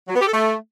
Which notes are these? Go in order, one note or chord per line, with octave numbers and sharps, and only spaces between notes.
F#3
B3
G4
A4
A3